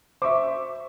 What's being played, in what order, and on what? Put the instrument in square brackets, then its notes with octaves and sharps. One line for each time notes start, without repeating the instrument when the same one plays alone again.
[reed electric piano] C5 [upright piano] E5 C#6 D6